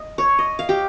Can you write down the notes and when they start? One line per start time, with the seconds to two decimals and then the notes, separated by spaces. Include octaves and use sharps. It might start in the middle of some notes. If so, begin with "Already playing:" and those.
Already playing: D#5
0.18 C#5
0.39 D#5
0.59 F5
0.69 G4